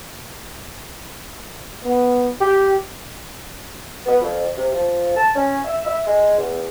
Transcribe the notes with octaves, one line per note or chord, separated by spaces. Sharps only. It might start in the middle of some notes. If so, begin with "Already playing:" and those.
B3
G4
B3
F2
C3
F3
A5
C#4
E5
E5
G#3
E2